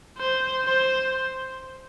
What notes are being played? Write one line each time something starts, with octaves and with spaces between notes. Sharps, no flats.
C5
C5